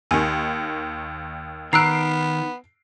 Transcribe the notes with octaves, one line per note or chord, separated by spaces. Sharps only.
D#2 D#3 G#5
D#3 B3 A#5 E6 F#6 C7 D7